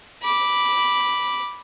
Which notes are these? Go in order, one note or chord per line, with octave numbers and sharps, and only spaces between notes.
B5 D6